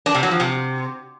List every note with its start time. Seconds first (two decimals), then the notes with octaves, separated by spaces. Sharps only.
0.06 D4
0.14 C3
0.23 F#3
0.31 F3
0.40 C3